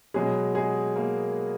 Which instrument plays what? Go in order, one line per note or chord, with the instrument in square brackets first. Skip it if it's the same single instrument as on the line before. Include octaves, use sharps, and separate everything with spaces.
[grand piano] B2 F#3 G#3 G#4
G#3 G#4
A#3 A#4